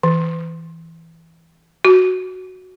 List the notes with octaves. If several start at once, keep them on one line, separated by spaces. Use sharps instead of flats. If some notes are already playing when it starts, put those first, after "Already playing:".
E3
F#4